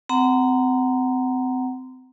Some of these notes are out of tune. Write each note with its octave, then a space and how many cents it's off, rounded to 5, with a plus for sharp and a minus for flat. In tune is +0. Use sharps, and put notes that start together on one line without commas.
C4 -30 F#5 +15 A#5 +0